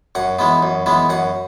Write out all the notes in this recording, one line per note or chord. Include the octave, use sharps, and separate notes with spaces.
F#2 F#5
E3 G#3 B3
F#2
E3 G#3 B3
F#2 F#5